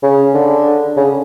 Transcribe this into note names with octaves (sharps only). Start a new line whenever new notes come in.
C#3
D3
C#3